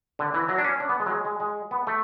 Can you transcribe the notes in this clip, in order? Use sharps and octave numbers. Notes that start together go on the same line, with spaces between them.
D3
E3
F#3
D4
C#4
D4
B3
G#3
F#3
G#3
G#3
G#3
B3
A3